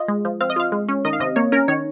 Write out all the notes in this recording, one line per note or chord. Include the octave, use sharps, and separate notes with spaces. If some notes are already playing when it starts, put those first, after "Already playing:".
Already playing: F4 D#5
G#3
F3
C4 F5
D#5
F4 F5
G#3
C#4
D#3 D#5
F5
C3 D#5
A#3 C#5
C#4 A#4
D#3 C#5